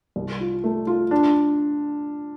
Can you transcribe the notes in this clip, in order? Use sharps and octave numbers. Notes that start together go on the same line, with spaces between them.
C2
F4
A3
F4
D4